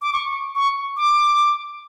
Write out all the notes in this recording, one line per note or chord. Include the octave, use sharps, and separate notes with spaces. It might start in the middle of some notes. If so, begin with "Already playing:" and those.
D6
C#6
C#6
D6